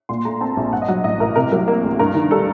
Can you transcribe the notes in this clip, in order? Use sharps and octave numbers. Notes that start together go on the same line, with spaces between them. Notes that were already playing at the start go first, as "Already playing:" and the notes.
A#2 C6
A3 A#5
C4 A5
A#1
G2 F#5
D#5
F#3 F#5
A1 D#5
A1 A#4
C3 A#4
F#3 A#4
A#3
D2
G2 A#4
D#3
G3 A4